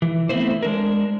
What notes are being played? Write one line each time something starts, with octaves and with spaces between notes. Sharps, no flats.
E3
A3 B3 C4 E4 C5
G#3 D4 A#4